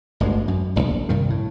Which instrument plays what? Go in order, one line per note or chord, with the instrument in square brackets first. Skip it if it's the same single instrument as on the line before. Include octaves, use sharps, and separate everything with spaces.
[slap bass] G1 D2 G2 G#3
F#2
E1 A#1
C2 G2 D#3
A2